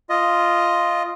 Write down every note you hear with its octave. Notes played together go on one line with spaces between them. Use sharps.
F4 D#5